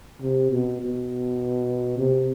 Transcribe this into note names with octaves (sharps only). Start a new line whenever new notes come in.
C3
B2
B2
C3